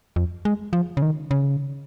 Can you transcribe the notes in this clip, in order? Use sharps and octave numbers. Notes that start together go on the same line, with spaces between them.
F2
G#3
F3
C#3
D#3
C#3